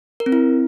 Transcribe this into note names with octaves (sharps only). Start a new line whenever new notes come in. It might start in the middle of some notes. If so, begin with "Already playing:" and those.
A#4
C4
E4